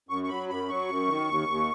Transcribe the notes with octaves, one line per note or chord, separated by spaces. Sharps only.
F#2 C#6
C#6
F#3 B5
F#2 B5
F#3 C#6
F#2
D#3
D#2
D#2